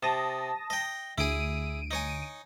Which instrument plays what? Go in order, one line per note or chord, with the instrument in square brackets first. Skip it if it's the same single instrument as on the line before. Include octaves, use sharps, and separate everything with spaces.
[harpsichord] C3 [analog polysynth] A5 D#6 A#6
[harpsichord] D#5 G5
[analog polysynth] D2 D7 D#7 [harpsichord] E4 G#4
[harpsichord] D#4 C#5 G#5